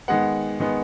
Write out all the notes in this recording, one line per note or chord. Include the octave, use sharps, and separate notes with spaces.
D#3 G#3 B3 F#5
D#3 G#3 B3